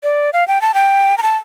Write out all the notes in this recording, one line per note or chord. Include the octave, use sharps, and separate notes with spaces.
D5
F5
G5
A5
G5
A#5
A5